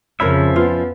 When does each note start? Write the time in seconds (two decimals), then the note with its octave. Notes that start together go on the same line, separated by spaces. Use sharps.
0.20 F2 C#3 F3 C#4 A#4 C#5 E5 B5
0.56 B3 F4